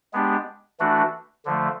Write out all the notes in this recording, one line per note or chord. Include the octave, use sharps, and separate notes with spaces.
G#3 B3 D4 G4
E3 A3 D4 F#4
D3 F3 A3